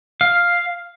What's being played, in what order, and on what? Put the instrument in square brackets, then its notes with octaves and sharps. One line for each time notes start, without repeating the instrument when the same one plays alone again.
[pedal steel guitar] F5